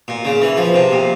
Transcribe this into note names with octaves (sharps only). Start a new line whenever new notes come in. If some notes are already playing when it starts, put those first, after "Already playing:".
A#2
C#3
E3
F3
C3
A#2